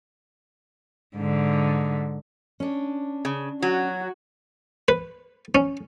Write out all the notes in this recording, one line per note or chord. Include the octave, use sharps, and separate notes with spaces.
G#2 D3
C#4 D4
C#3
F#3 F#4
B4
C#4